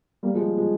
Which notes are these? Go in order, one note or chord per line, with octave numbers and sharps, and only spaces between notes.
G3 A#3
F3 G#3
F3 G#3